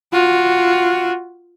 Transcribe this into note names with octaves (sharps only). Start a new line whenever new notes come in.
F4 F#4